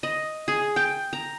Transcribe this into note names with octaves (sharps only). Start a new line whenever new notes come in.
D#5
G#4
G5
A#5